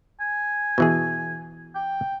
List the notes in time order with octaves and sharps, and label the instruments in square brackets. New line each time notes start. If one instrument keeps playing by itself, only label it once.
[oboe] G#5
[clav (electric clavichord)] B2 E3 G#4
[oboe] G5